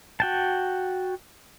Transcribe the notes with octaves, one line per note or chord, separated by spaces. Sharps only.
F#4 G5 A5